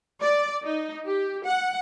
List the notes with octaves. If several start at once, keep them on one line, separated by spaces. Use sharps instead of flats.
D5
D#4
G4
F#5